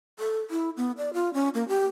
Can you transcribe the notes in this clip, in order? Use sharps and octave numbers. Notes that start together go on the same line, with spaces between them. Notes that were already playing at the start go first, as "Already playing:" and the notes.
A4
E4
B3
D5
F4
C#4
A#3
G4